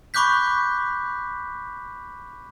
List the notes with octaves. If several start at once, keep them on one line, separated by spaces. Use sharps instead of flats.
B5 C#6 D6 F#6 G6 B6